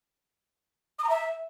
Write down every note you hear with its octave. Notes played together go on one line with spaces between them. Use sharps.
D#6
A#5
E5